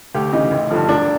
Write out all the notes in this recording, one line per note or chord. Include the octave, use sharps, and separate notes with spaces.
D2 G4
C#3 E3 D#4
A1
G2 D3 F3
E1 D4